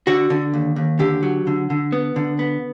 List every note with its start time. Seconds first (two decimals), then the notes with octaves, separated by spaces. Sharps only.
0.07 D3 F#4
0.30 D3
0.54 D#2
0.76 D#2
0.99 D3 G4
1.23 F#3
1.47 D3
1.70 D3
1.92 B3
2.16 D3
2.39 B3